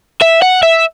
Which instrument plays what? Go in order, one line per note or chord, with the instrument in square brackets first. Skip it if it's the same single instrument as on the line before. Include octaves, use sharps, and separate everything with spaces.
[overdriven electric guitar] E5
F#5
E5